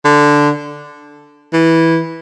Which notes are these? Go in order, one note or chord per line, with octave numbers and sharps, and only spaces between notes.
D3
E3